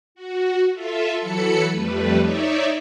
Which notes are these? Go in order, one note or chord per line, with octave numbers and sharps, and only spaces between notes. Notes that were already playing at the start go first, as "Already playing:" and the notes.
F#4
F4 A4 E5
E3 F#3 A4 B5 C#7
F2 G3 A3 B4
D#4 C#5 D5 E5